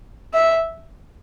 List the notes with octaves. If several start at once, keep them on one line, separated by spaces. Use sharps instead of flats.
E5